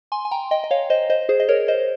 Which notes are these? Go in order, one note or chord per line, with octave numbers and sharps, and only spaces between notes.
G#5 C6
G#5
G5 A#5
D#5 G5
D#5
C#5 F5
C5 D#5
C5 D#5
G#4 C5
D#5
A#4 C#5
C5 D#5